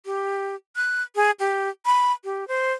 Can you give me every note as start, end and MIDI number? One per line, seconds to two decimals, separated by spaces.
0.05 0.55 67
0.76 1.02 90
1.15 1.31 68
1.39 1.69 67
1.86 2.12 83
2.24 2.47 67
2.48 2.72 72